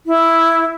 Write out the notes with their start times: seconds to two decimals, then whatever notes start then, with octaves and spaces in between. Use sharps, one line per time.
0.06 E4